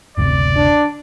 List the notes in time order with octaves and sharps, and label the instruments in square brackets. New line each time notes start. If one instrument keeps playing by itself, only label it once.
[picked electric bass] F#1 D2 C3 [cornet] D5
[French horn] D4